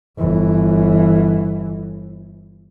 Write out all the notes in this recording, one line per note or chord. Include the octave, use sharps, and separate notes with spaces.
G1 E3